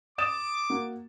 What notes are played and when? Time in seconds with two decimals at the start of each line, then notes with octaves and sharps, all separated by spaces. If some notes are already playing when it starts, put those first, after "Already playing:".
0.18 D6 D#6 A6 E7
0.70 A#3 F#4